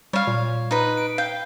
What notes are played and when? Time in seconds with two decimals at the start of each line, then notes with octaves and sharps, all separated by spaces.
0.13 G3 C#5 F5
0.27 A#2
0.71 D#4 B4
0.97 D7
1.18 F5 G5